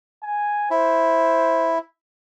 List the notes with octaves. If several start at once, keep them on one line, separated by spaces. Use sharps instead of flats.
G#5
E4 C5